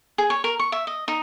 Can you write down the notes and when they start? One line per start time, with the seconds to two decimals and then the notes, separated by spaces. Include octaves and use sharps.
0.18 G#4
0.30 C#5
0.44 A#4
0.60 C#6
0.72 E5
0.87 D#5
1.08 D#4